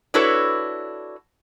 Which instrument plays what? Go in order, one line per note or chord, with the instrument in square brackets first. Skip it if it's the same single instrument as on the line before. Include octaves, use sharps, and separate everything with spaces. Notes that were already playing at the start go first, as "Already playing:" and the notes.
[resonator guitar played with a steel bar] D4 E4 F#4 A4 B4 C#5